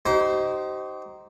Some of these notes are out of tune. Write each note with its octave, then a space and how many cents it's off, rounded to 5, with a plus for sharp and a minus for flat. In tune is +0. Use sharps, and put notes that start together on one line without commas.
D#4 +0 G4 -40 C5 +0